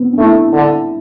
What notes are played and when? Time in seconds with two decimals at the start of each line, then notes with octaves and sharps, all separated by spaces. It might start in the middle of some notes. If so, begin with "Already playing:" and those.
Already playing: B3 C4
0.12 D4
0.18 A3 E4
0.53 D3